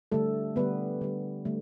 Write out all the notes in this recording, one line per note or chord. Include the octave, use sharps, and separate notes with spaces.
D3 G3 A3 A4
D3 G3 B3 B4
D3 G3
D3 G3 A3